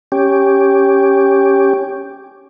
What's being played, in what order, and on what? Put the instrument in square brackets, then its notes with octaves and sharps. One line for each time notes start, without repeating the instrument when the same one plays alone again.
[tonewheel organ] C#4 G4